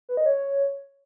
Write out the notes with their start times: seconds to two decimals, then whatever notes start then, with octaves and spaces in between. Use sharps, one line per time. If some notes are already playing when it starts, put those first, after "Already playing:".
0.09 B4
0.17 D#5
0.26 C#5